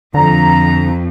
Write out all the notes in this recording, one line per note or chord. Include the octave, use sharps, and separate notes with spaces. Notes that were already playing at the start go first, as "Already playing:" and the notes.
F2 D3 A#5